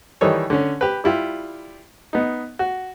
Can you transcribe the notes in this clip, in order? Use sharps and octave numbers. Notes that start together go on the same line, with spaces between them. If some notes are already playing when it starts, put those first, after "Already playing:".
D#3 E3 G3 D#4 A4 C#5
D3 C#4
G4 B4
G3 E4 F4 G4
B3 D#4
F#4